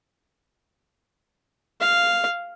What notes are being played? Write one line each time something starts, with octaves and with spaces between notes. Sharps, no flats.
F5